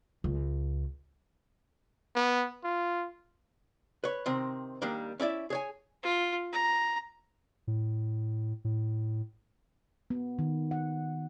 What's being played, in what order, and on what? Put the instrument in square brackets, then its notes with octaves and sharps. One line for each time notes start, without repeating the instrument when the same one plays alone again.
[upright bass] C#2
[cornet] B3
F4
[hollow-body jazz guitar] B4 C#5
C3 D#3 C4
D#3 G3 A#3 D4
C#4 E4 D5 E5
G#4 C#5 G#5
[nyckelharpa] F4
A#5
[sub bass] A2
A2
[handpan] B3
D#3
F#5